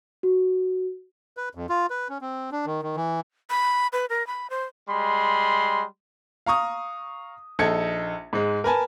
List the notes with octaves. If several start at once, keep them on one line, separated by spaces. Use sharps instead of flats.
F#4
B4
F2
F4
B4
C#4
C4
D4
D#3
D#3
E3
B5
B4
A#4
B5
C5
G3 G#3 B5 C6
F5 A#5 C#6 D#6
A#1 D#4 A4 G#6 C#7
G#2 G#3
A#4 B4 G#5 A5